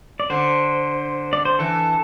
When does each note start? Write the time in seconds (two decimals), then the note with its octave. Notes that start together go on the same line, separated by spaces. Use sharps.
0.20 D5
0.30 D3 C5
1.33 D5
1.45 C5
1.59 E3 A4